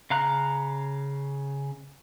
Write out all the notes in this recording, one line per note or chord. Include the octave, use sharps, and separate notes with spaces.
C#3 F5 A#5 F#6